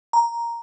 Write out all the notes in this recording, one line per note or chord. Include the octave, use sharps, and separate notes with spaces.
A#5